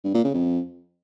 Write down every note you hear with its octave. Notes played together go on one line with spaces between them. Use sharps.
G2
A#2
C#3
F2